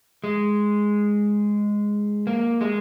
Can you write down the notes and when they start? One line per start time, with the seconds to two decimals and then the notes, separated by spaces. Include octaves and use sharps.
0.24 G#3
2.27 A#3
2.61 G#3